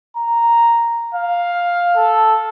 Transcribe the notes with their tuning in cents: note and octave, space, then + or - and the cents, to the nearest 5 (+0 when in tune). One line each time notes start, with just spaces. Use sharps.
A#5 +0
F5 +5
A4 -5